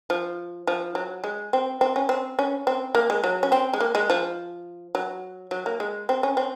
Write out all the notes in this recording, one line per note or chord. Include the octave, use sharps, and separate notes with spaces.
F3
F3
F#3
G#3
C4
C4
C#4
C4
C#4
C4
A#3
G#3
F#3
C#4
C4
G#3
A#3
G#3
F3
F#3
F#3
A#3
G#3
C4
C#4
C4